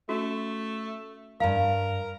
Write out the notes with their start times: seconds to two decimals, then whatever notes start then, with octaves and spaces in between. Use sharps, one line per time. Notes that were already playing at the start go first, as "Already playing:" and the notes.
0.09 A3 C#4 F#4
1.40 G2 A#4 F5 A#5